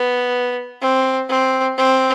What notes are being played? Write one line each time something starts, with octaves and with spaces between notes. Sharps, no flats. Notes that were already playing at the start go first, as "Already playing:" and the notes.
Already playing: B3
C4
C4
C4